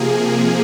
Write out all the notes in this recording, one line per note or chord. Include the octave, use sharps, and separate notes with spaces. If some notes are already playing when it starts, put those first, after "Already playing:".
Already playing: C3 F3 A#3 G#4